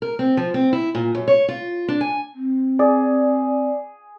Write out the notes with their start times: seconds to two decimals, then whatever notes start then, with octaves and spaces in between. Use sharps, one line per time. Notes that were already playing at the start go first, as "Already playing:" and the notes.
0.02 A#4
0.19 C4
0.37 F3
0.54 C4
0.73 E4
0.95 A#2
1.15 F#2
1.28 C#5
1.48 F4
1.88 D4
2.01 G#5
2.35 C4
2.79 G#4 D5